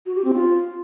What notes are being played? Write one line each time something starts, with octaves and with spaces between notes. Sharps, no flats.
F#4
G4
C4
F4